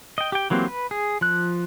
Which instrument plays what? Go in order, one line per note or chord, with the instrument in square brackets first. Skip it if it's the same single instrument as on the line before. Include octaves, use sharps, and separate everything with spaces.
[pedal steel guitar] D#5 G5
G4 G5
E3 F#3 A#3 C4 G4
B4
G#4
F3 F#6